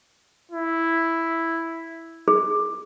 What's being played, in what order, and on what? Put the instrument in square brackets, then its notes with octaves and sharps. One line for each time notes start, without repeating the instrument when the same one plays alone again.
[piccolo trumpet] E4
[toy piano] G#4